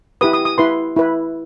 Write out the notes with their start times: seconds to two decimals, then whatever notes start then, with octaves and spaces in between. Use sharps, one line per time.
0.21 E4 G4 B4 D#6
0.33 D#6
0.45 D#6
0.58 E4 B4 C6
0.96 E4 B4